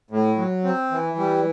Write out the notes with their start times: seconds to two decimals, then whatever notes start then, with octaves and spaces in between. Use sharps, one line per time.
0.11 A2
0.37 F#3
0.64 C4
0.91 E3
1.17 G3